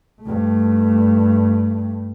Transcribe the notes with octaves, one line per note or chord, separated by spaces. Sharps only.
G2 A3